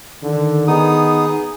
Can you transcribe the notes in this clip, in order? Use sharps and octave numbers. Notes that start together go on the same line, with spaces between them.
D3 D#3
B3 D#4 G#4 D#6